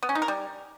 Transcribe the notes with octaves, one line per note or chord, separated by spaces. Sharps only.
B3
C#4
D#4
A#4
G3